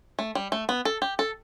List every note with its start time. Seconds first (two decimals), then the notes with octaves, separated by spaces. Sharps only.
0.19 A3
0.35 G3
0.52 A3
0.69 B3
0.85 A4
1.02 G4
1.19 A4